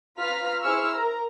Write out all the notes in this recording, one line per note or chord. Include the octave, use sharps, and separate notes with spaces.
F4 B4 F5 A#5 F6 B6
E4 G#4 C5 C#6 E6 F6
A#4 A#5